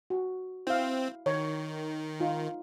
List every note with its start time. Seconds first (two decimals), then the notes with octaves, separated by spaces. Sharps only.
0.10 F#4
0.67 C4 E4 F5
1.26 D#3 C#5
2.20 D#4 F4